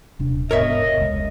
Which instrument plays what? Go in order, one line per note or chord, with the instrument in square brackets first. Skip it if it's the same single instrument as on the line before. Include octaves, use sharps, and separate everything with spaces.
[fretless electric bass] D#1 C3 D4
[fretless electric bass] E1 G#2 B3 [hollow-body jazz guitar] A#4 C#5 E5 [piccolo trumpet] D#5
[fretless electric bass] F1 C#2 G#3